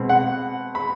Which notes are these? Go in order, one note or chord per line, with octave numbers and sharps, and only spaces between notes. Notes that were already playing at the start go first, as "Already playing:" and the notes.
Already playing: B2 G#3 C4
F#5
B5